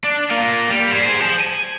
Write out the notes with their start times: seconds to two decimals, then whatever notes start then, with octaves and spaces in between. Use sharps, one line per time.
0.04 D4
0.30 A#3 F4
0.69 G3
0.92 G#4 C5
1.22 C5 A5
1.41 G#5